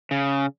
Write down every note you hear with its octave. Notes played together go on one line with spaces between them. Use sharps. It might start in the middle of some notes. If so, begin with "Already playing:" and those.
C#3